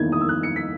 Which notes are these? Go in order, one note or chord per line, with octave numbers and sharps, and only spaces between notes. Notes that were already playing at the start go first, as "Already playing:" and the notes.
Already playing: E2 D#3 A#3 E4 G#6
D#6
E6
F#6
C#7
B6